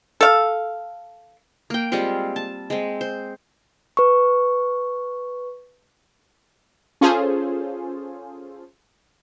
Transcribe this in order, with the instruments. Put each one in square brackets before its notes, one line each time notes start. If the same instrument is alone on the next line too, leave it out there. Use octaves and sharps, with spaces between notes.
[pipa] A4 F5
[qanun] A#3 G5
G3 G#3 C4 F4
A5
G#3 C4
C5
[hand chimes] B4 C#6
[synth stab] C#4 F4 G#4 A4 C5